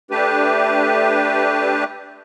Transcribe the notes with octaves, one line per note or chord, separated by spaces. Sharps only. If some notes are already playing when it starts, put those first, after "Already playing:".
A3 D4 G4 B4